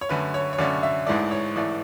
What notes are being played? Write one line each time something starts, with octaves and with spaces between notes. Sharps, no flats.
C#5
F#2 D3 A3 C#4 B4
C#5
C#5
F#2 D3 A3 C#4 D5
E5
A1 G#2 E3 A3 D5
C#5
A1 G#2 E3 A3 D5